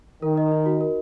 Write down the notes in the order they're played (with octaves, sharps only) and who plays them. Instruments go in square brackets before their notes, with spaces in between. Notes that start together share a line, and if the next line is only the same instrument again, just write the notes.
[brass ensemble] D#3 [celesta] A#4
[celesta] D#5
D#4
F#4
A#4